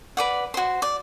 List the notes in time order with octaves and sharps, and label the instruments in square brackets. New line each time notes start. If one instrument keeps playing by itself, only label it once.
[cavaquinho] B4 D5 F#5
F#4 C5
D5